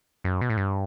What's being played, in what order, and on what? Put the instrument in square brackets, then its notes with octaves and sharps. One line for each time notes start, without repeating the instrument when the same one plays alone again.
[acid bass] F#2
B2
A2
G2